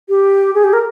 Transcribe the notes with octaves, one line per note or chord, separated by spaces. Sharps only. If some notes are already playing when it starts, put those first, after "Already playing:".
G4
G#4
G4
A#4